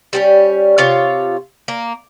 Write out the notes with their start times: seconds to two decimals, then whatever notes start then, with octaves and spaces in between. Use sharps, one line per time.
0.13 G3 C4 C#4
0.78 C3 F4 C#5 F5
1.68 A#3